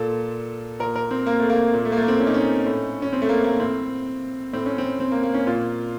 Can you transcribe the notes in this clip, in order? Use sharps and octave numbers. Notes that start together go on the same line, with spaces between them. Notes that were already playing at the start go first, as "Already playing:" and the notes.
Already playing: A#2 A4
A#2 A#4
A#4
C4
A#3
A3
A#3
A#2
A3
A#3
A3
A#3
C4
C#4
D#4
C#4
A2
C#4
C4
A3
A#3
A#3
A2 C4
A2 C4
C#4
C4
C4
A#3
A#3
C#4
A#2 F4